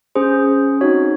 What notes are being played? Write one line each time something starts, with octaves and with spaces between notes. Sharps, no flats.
C#4 G#4 C5
C4 D#4 F#4 C#5